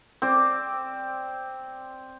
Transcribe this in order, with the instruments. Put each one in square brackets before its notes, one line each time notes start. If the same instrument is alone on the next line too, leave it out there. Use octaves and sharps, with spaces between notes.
[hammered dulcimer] C4 D5